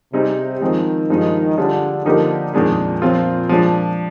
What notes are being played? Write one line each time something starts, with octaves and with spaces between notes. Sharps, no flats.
C3 G3 C4 D#4 G#4
D#3 F3 G#3 C4
G2 F3 G#3 D#4
D3 G3 D4 F4 G#4
D3 F3 A#3 D#4 G4 A#4
F2 A#2 D#3 G#3 D4 G#4
F3 C4 F4
F3 G#3 D4